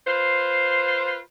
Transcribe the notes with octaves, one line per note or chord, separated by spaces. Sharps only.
F4 B4 C5